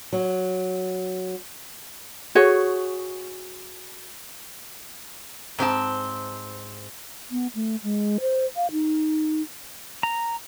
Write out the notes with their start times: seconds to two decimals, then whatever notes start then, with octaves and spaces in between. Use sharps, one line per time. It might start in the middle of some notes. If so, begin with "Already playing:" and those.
0.13 F#3
2.35 F#4 G#4 C#5
5.59 G#2 C4 G4 A5
7.31 B3
7.55 A3
7.83 G#3
8.21 C5
8.56 F5
8.72 D#4
10.03 A#5